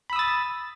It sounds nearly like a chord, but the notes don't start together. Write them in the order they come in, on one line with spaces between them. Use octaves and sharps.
B5 E6 D#6 A6